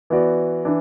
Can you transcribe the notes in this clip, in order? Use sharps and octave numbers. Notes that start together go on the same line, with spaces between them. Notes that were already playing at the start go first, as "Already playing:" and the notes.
E3 B3 F#4 D5
E3 D4